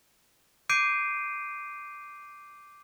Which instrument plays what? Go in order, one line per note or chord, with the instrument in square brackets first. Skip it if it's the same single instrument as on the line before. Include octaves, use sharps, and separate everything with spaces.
[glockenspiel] D6 G6 C7 D7 D#7